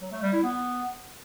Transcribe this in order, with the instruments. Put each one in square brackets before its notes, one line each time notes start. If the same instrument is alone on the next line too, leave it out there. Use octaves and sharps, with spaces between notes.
[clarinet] F#3
A3
G3
E4
B3